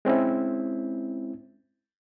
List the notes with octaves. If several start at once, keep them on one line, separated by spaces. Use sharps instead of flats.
G#3 C4 C#4 E4